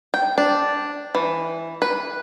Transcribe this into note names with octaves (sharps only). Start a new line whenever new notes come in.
G5
D4
E3
B4